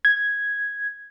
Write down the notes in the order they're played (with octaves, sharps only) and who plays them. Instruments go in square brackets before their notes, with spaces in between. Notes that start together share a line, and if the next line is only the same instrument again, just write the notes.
[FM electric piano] G#6